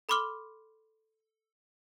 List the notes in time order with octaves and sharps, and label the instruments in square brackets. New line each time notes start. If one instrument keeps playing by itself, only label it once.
[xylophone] A4 B5 C6 D6 F6 G7